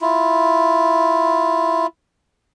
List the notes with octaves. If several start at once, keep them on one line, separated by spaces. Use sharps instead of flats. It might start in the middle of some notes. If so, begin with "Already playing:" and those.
E4 F4